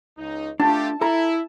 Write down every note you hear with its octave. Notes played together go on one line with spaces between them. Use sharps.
C#2 D#4
A3 D4 F4 G4 A5
E4 A4 A#5